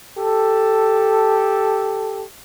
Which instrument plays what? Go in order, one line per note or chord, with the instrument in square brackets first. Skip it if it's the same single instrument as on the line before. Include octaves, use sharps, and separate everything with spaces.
[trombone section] G4 A4